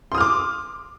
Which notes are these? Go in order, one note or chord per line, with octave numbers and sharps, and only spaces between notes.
C6 D6 D#6 F6